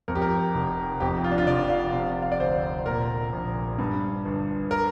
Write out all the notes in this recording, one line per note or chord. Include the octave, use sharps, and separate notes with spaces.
F2 A#4
G4
A#4
F1
F2 G4
F4
D4
F4
F1 D5
F5
C3
F5
D5
D2 C5
A#2 A#4
A#1
G2
G1
A#4